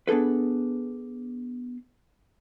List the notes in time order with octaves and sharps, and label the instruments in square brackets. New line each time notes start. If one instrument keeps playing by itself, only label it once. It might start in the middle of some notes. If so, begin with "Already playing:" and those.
[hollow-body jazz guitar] B3 D4 G#4 A4 B4